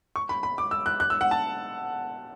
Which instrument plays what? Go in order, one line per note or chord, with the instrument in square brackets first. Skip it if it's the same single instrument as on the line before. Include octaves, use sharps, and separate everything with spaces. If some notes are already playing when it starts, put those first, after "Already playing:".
[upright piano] C#6
B5
B5
D6
E6
F#6
F#6
E6
F#5
A5